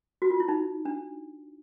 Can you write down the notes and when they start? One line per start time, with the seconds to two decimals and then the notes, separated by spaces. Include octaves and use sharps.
0.22 F#4
0.30 F4
0.40 E4
0.48 D#4
0.85 D4